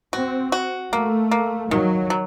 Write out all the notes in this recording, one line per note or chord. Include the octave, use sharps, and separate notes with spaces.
C4 F#4
F#4
A3 A#3
A#3
D#3 F#3
F#3